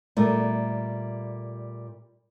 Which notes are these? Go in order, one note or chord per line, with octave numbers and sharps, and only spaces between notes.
A#2 G3 A3